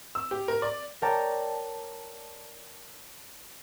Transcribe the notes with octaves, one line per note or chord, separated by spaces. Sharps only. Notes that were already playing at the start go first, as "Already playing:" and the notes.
E6
G4
A#4
D5
A#4 C#5 D5 G5 A5 A#5